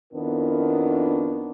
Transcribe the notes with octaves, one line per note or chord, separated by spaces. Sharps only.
F2 D#3 B3 D4 E4 A#4